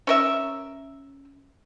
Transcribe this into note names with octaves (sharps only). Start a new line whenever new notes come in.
C#4 A#4 E5